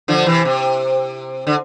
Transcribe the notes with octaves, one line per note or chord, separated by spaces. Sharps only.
D3 F3
C3 E3
C3
D3